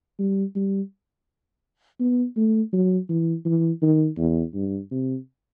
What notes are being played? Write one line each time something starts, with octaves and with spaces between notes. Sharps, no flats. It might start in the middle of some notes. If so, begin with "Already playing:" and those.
G3
G3
B3
A3
F#3
E3
E3
D#3
E2
G2
C3